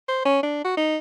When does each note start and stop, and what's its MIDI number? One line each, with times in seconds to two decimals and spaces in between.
0.08 0.23 72
0.25 0.42 61
0.43 0.62 62
0.65 0.75 66
0.77 0.97 63